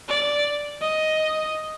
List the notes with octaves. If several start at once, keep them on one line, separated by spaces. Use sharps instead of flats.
D5
D#5